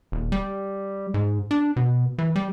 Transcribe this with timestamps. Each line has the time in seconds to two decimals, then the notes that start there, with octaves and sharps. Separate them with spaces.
0.12 D#1
0.32 G3
1.14 G#2
1.51 D4
1.76 B2
2.18 E3
2.36 G3